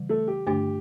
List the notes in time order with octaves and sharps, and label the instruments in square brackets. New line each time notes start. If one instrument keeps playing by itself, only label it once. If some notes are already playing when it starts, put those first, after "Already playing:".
Already playing: [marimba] C#3 E3 G3
[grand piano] A3 A4
G4
[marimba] G2 D3 A3 D4 [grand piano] G4